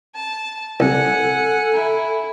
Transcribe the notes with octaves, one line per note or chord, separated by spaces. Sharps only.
A5
C2 A4 F#5 G#5
E4